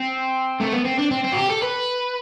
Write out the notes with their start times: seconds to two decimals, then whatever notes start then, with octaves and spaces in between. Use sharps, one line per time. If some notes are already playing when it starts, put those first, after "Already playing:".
Already playing: C4
0.60 A3
0.73 B3
0.85 C4
0.99 D4
1.11 C4
1.24 C4
1.32 F#4
1.37 G4
1.49 A4
1.62 B4